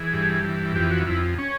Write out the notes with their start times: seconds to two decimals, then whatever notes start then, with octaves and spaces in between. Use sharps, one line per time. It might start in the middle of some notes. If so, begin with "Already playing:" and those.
Already playing: E3 G#4
0.13 G2
0.44 E3
0.76 F2 G4
0.91 F#4
1.07 F2 E4
1.38 C#4